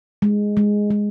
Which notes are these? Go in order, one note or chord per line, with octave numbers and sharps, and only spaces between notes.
G#3
G#3
G#3